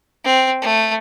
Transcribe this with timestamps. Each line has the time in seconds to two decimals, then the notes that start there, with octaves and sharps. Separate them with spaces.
0.24 C4
0.62 A3